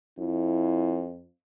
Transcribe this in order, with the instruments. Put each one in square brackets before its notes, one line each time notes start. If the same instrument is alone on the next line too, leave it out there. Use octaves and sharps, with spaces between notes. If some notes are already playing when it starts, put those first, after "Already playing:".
[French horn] F2 [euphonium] E4